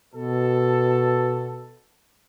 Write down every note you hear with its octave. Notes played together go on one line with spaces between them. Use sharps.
B2 A4